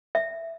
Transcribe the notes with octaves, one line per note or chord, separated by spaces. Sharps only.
E5